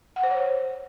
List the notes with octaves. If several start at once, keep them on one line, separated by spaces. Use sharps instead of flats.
F#5
C5
C#5